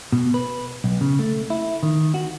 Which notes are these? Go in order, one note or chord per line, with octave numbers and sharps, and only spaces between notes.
B2
B4
B1
C#3
A3
E4
D#3
F#4